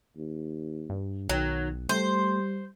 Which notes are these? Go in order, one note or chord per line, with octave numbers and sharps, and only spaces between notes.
D#2
G2
B1 D#3 F#3
G3 A3 C5